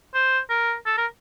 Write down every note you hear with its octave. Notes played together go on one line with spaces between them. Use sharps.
C5
A#4
A4
A#4